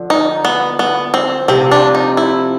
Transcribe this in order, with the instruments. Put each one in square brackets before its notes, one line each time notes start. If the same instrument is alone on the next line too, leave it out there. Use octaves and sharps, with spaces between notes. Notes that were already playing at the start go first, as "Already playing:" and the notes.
Already playing: [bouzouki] D3 F3
[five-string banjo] D#4
B3
B3
C4
[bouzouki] C3 F3 A3 [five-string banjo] C4
[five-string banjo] D4
D#4
E4